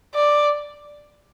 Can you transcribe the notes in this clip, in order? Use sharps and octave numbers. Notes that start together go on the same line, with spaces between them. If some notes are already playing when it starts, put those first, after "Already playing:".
D5